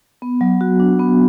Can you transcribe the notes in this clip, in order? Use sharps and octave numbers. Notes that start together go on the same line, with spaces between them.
B3
F#3
F#4
D4
B3